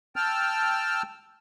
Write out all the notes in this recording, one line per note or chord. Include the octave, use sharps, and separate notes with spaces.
G5 A5 E6 F6